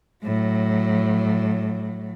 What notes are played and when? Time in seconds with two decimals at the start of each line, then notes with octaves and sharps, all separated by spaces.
0.24 A2 F#3